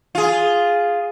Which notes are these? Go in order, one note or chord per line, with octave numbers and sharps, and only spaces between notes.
F4 G#4